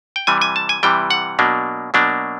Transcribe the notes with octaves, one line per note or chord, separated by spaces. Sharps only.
G5
C3 E3 G3 G#5
G#5
A5
G#5
C3 E3 G3 G5
F#5
B2 F#3 A#3 D4
B2 F#3 A#3 D4